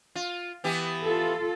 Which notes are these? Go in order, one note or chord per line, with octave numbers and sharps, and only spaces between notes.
F4
E3 B3 G4
F4 A4